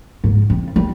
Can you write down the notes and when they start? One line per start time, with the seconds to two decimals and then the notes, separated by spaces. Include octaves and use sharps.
0.24 G#2
0.50 F2
0.76 G3